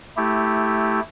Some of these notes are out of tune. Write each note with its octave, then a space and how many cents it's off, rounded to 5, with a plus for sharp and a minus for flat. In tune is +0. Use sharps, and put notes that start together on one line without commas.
A3 +0 E4 -10 G4 +0